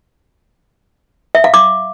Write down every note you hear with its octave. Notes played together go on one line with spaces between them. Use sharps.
E5
F5
D6